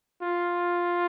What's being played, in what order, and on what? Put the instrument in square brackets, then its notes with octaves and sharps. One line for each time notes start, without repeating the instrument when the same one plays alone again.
[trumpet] F4